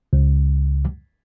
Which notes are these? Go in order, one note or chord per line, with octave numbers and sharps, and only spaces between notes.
C#2